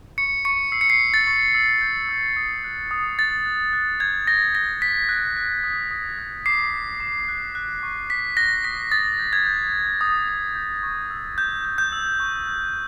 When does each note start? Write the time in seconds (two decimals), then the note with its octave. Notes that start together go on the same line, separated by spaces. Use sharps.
0.18 C#6 C#7
0.45 C#6 C#7
0.72 E6 C7
0.81 C#7
0.90 C7
1.00 C#6
1.14 A6
1.27 C#6
1.55 E6
1.81 G6
2.09 E6
2.36 D#6
2.64 F#6
2.91 D#6
3.19 F#6 A6
3.46 F#6
3.73 F#6
4.00 G6 G#6
4.27 G6 A#6
4.55 D#6 A#6
4.82 F#6 B6
5.09 F#6
5.37 F#6
5.64 D#6
5.91 D#6
6.19 F#6
6.46 D6 C7
6.73 D6
7.00 D6
7.28 F#6
7.55 F#6
7.83 C#6
8.10 F#6 B6
8.37 F#6 A#6
8.64 D#6 B6
8.91 D#6 A6
9.19 G6
9.33 G#6
9.47 G6
9.73 G6
10.01 D#6
10.28 D#6
10.55 G6
10.83 C#6
11.10 E6
11.38 G6
11.65 G6
11.78 G6
11.92 E6
12.20 C#6
12.47 F#6